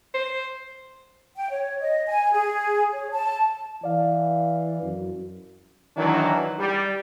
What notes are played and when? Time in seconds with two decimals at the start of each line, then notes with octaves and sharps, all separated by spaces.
0.14 C5
1.36 G5
1.50 C#5
1.80 D#5
2.08 G#5
2.32 G#4
2.93 C#5
3.11 A5
3.83 E3 D5 F5
4.82 F#2
5.97 D#3 E3 F#3 D4 E4
6.58 G3